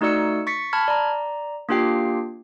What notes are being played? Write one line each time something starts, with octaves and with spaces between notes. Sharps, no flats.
A3 D#4 F#4 D5 E6 C#7
C#6 A6 B6 C#7
A5 B5 F6 G#6
D5 A#5
A#3 D4 F4 G4 G5 C7